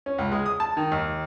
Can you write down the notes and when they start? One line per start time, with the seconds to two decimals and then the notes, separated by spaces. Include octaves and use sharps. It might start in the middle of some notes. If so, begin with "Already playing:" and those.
0.06 C#4
0.18 C#2
0.32 G#3
0.46 D#6
0.60 A5
0.77 D#3
0.92 D#2